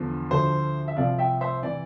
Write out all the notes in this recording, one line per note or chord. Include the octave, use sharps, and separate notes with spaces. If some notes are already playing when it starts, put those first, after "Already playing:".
Already playing: E2 D3 F3
D2 D3 F3 C5
E5
C2 C3 F3 D5 F5
E5 G5
C5 E5
C3 E3 D5